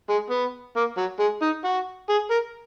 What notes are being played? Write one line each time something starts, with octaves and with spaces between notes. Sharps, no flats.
G#3
B3
A#3
F#3
G#3
D#4
F#4
G#4
A#4